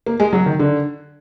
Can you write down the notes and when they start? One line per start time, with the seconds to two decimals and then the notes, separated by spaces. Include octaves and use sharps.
0.06 A#3
0.20 G#3
0.33 F#3
0.46 D#3
0.59 D3